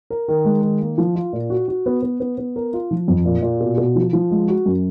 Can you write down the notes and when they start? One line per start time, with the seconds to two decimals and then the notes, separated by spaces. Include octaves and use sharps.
0.10 A#4
0.28 D#3
0.45 G#3
0.62 D#3
0.81 A#3
0.98 F3
1.15 F4
1.33 A#2
1.50 F#4
1.68 F#4
1.86 B3
2.02 B3
2.20 B3
2.38 B3
2.56 A#4
2.73 F4
2.91 F3
3.08 F2
3.25 A#2
3.42 A#2
3.60 B2
3.77 B2
3.95 F3
4.13 F3
4.31 G#3
4.48 F#4
4.66 F#2